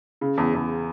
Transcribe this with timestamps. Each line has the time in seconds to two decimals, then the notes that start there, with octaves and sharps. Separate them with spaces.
0.21 C#3
0.37 E2
0.54 E2